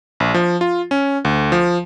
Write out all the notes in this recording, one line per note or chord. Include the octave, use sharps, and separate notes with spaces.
A#1
F3
F4
C#4
D2
F3